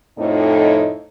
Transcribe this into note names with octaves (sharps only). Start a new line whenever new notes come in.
F2 A2 D#4